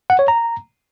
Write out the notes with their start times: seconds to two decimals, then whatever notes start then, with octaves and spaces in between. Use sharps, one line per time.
0.10 F#5
0.19 C#5
0.28 A#5